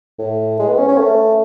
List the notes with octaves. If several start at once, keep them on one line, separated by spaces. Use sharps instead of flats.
A2
G#3
B3
C#4
C#4
A3